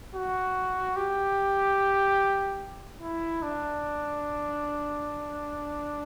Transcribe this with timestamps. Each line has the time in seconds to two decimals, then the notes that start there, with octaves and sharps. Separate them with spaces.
0.15 F#4
0.96 G4
3.02 E4
3.42 D4